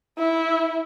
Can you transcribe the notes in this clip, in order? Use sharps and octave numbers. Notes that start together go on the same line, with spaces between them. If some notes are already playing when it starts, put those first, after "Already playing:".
E4